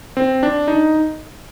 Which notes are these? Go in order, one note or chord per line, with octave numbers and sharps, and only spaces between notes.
C4
D4
D#4